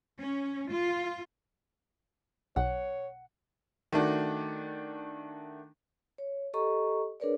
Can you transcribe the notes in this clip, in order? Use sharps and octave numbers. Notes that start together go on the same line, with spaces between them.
C#4
F4
B1 C#5 F#5
D#3 A3 D4 F#4
C#5
G4 A4 D#5 A#5 C#6
D4 G#4 A#4 B4 C#5 D5